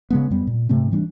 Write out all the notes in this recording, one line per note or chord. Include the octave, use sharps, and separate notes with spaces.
C#3 G#3 B3
F2 G3 B3
A#2
G#2 C3 A3 C4
E3 G3 C#4 D4